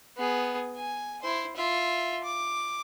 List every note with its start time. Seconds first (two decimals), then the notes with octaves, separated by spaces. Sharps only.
0.17 B3 G#4
0.76 G#5
1.22 E4 C5
1.56 F4 E5
2.24 D6